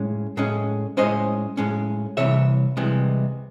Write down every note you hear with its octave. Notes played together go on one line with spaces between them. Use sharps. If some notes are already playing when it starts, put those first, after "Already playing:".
Already playing: A2 G#3 C#4
A2 G#3 C#4
A2 G#3 C#4 C5 D#5
A2 G#3 C#4
C2 C3 E3 C#5 E5
C2 C3 E3 G#3